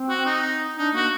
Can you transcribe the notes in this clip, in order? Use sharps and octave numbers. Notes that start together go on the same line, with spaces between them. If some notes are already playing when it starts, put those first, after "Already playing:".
Already playing: C4
F#4
D#4
D4 D#4
A#3 F#4